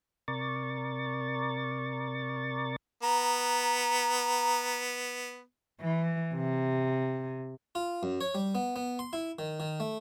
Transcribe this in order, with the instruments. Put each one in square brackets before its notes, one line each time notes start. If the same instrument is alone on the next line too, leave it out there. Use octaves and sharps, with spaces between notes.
[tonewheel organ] C3 A#4 D5 C#6 A6
[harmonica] B3 [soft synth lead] A#5
[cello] E3
C3
[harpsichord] F4
F#2
C#5
G3
B3
B3
C6
E4
D#3
D#3
A3